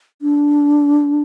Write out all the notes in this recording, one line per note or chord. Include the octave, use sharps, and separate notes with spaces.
D4